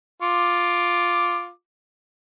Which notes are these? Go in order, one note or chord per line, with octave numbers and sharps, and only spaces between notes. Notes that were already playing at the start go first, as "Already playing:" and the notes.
F4 D6